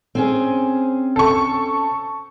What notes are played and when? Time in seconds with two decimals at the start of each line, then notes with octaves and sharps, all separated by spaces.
0.15 C4 C#4 G#4
1.16 A4 C#6